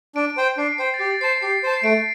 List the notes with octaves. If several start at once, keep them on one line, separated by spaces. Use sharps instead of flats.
D4 D7
D7
C5 G5
D4 C7
D7
C5 G5 C7
A6
G4 C7
A6
C5 A5 C7
G4 C7
C5 A5
C7
A3 D7